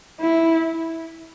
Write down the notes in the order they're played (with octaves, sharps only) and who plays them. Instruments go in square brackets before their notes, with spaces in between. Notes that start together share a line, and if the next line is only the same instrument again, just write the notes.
[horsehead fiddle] E4